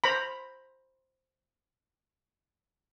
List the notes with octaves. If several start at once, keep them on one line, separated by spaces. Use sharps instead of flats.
C5 A#5 B5